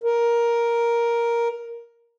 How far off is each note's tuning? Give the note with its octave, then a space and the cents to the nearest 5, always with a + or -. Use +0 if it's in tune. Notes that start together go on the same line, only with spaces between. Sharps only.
A#4 +10